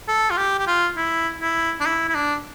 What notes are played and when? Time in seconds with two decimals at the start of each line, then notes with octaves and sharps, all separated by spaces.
0.08 A4
0.31 F4
0.38 G4
0.59 G4
0.67 F4
0.97 E4
1.41 E4
1.81 D4
1.86 E4
2.09 E4
2.15 D4